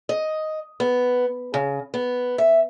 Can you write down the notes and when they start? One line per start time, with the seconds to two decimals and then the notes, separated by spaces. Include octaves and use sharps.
0.09 D#5
0.80 B3
1.54 C#3
1.94 B3
2.38 E5